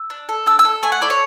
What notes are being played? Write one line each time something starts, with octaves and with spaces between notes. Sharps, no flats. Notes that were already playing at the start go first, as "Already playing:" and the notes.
Already playing: E6
D4
A4
D4 E6
E6
A4
A3 G#5
F#5
E4 A4 D5
C#5